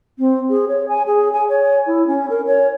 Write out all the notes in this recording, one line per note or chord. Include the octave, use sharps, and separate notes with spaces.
C4
G#4
C#5
G#5
G#4
G#5
C#5
E4
C#4
A#4
C#5